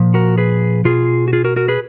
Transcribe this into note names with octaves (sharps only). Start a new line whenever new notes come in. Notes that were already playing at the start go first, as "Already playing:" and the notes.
Already playing: A#2 F3
F#4 A#4
G#4 B4
B2 F4 G#4
F#4
F4 G#4
F#4 A#4
F#4 A#4
G#4 B4